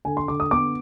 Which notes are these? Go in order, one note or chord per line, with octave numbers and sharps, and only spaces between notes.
D3 G#5
C6
D3 D6
D#6
B3 D6